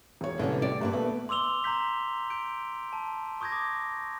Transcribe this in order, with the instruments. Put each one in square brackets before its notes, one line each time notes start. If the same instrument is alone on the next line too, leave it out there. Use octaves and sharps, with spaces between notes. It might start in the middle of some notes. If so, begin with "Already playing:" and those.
[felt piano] E1 C#5
[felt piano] C2 [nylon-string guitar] D3 C#4 [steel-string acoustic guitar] B4 E5
[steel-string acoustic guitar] A2 [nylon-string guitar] D5
[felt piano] G2 [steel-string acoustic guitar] E3 A#3 B4
[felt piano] B2 A3 B3
[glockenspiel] C6 D6 E6 F7 G7
A#5 C6 G6 B6
G6 D7
A5
C#6 D#6 G6 G#6 A#6
D6 D#6